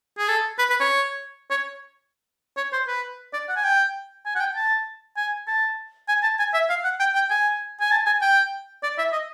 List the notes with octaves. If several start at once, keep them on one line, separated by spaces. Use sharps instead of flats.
G#4
A4
B4
B4
C#5
C#5
C#5
C5
B4
D5
F#5
G#5
G5
G#5
F#5
G5
A5
G#5
A5
G#5
A5
G#5
E5
F5
F#5
G5
G5
G#5
G#5
A5
G#5
G5
D5
E5
D#5